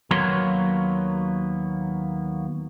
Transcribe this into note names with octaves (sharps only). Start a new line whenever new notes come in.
D#2 F#3 A#3 B3 C#5 C6